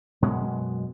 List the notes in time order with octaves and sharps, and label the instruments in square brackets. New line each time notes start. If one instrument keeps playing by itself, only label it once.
[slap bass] F#2 B2 G#3 B3